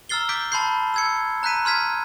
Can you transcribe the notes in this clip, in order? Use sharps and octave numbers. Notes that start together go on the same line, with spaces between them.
A#5 E6 F6 A6 C7 G7
D6 G6 B6 D7
A5 B5 C6 G6 C7
E6 G#6 C#7
A#5 F#6 G6 B6 D#7
C6 F6 G#6 B6